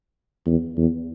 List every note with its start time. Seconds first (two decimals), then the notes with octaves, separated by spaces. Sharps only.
0.46 E2
0.77 E2